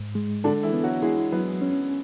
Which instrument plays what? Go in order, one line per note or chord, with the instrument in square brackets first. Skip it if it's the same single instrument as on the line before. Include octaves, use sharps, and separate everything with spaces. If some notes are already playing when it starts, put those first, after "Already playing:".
Already playing: [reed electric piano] G#2
G#3
[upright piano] D3 D4 [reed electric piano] A4
[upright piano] E3 E4
[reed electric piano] B3
[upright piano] F#3 F#4
[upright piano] G#3 G#4 [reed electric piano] E4
[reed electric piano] F#3 [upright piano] B3 B4
[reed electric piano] C#4